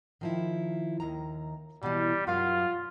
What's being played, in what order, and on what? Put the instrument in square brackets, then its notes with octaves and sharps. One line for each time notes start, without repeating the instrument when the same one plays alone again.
[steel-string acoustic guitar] D#3 F3 E4
D#2 D#3 A#5
[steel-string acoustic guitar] B2 E3 [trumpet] G3
[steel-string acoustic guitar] F#2 F#3 F5 [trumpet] F4